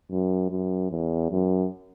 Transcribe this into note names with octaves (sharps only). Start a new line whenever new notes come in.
F#2
F#2
E2
F#2